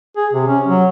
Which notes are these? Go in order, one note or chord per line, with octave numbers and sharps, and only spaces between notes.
G#4
C3
C#4
F#3